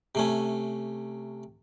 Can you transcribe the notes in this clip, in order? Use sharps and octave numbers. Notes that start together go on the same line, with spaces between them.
C3 A3 C#4